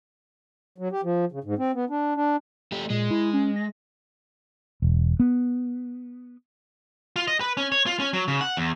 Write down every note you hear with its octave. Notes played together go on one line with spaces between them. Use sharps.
F#3
G4
F3
C#3
G#2
C4
B3
D4
D4
A3 G4
A#2 G#3
E4
C#4
A#6
E1
B3
F4
D#5
B4
C#4
C#5
F4
C#4
F#3
C#3
F#5
E2